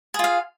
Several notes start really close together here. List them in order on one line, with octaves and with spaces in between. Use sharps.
G#4 F4 F5